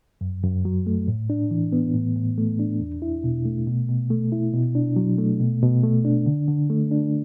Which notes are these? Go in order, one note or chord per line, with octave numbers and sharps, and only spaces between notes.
F#2
F#2
F#3
A3
A2
D4
E3
B3
A2
A2
A3
D4
E2
E4
B2
A3
B2
B2
A3
E4
B2
D4
F#3
A3
B2
B2
A3
D4
D3
D3
A3
D4